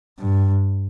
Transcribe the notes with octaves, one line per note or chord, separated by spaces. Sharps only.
G2